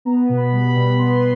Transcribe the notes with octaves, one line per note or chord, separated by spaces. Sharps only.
B3 A#5
B2
B5
G3
B5
B2
B3 C6